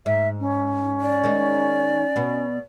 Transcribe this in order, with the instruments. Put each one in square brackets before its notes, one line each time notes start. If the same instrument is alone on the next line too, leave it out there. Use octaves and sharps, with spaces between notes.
[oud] G#2 [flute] E5
[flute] C#4
[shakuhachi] D5
[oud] D#3 G#3 D#4
B2 B3